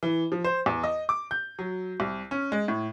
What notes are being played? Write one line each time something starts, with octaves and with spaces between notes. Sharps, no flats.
E3
F3
C5
E2
D#5
D6
G6
F#3
C2
C#4
G#3
A2